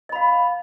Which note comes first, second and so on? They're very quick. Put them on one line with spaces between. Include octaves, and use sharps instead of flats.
D#5 B5 F5